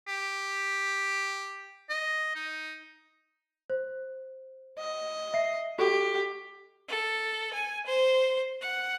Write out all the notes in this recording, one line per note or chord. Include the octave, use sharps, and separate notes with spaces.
G4
D#5
D#4
C5
D#5
E5 C7
F#4 G4 A4 C#6
A4
G#5
C5
F#5